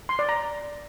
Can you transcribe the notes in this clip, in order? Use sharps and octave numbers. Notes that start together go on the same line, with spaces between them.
C6
D5
A#5